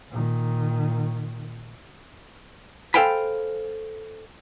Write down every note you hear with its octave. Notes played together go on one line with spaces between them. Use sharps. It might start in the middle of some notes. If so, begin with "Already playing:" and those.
A#2 D#3
A4 C5 F5 G5 G#5 B5